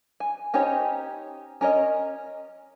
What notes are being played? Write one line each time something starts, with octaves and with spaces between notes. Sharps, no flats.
G#5
C#4 D#4 G4 C5 C#5
C#4 A#4 C#5 D#5